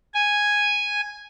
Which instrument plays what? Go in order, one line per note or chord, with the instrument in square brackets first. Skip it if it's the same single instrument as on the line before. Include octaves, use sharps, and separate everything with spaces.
[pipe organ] G#5